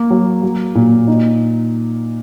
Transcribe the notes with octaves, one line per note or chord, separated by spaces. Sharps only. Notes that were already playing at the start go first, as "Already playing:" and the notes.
Already playing: A#3
F#3
F#3
A#2
D#4